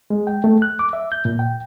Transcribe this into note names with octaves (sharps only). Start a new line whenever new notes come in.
G#3
G5
A3
F#6
D6
E5
G6
A#2
G5